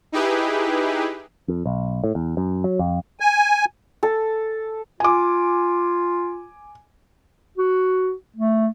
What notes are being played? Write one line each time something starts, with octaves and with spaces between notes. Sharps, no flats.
D#4 E4 G4 G#4 B4
F2
B1
A2
E2
F#2
F#3
F2
G#5
A4
F4 G#5 D6
F#4
A3